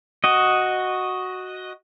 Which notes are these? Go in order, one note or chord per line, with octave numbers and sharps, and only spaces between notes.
F#4 D#5